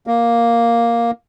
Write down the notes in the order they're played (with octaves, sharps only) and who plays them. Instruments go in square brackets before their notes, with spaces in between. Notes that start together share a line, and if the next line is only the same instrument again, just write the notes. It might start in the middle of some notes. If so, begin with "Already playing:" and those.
[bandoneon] A#3